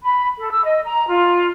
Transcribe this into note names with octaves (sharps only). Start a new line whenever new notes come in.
B5
A4
E6
D#5
A#5
F4